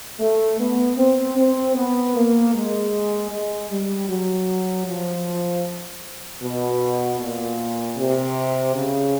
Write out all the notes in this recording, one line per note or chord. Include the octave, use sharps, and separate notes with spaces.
A3
B3
C4
C4
B3
A#3
G#3
G#3
G3
F#3
F3
B2
A#2
C3
C#3